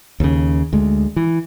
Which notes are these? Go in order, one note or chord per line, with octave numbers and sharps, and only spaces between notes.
D#2 C#3
D2 G#3
E3